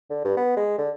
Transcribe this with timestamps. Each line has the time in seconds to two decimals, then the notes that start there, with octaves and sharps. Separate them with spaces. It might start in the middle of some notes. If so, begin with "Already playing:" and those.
0.10 D3
0.25 G2
0.37 B3
0.57 G#3
0.78 D3